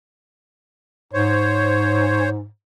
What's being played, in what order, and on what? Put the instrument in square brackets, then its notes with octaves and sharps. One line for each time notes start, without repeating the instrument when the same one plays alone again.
[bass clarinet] G#2 [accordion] C5 C#5